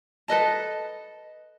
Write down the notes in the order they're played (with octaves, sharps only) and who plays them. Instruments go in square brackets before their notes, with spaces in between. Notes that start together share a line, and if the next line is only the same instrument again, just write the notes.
[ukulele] A4 B4 D#5 A5